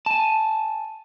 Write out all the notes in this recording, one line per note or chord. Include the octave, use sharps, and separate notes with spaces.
G#5 A5